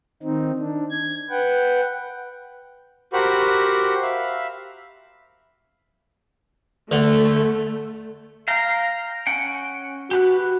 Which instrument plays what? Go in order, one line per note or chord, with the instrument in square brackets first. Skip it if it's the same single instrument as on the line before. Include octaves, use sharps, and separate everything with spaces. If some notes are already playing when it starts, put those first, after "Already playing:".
[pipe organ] D#3 C4 D#4
D4
G#6
B4 F#5 G5
[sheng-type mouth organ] F#4 G4 A#4 C5 F#5 B5
E5 F5 B5
[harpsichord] D3 [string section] A3
[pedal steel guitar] F5 G5 A#5
C#4 F#5 G5
[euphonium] F#4 [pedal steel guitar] G4 B4 F#6